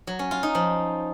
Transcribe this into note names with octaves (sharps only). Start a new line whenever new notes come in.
F#3
C#4
F4
D#4
F3